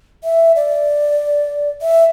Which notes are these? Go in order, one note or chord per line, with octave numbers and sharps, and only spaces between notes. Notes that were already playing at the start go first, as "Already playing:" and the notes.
E5
D5
E5